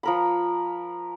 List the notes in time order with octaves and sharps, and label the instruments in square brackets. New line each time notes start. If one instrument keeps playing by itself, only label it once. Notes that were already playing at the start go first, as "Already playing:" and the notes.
[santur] F3 A#4 B5